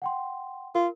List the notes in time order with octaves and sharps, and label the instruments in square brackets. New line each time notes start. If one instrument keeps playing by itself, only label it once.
[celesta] F#5 G5 C6
[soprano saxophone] F4 [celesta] A#4